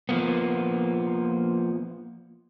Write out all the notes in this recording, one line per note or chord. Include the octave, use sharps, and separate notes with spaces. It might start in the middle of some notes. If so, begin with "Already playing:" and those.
F3 A#3 B3